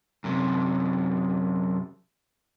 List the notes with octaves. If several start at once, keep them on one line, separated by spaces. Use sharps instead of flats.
F#2 C3